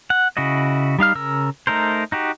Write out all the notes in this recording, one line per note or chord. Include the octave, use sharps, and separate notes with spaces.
F#5
C#3 E4 F#4 D#5
G3 D#4 F5 F6
C#3 A#4 E6
A3 D#4 A#4 C5
D#4 F#4 G4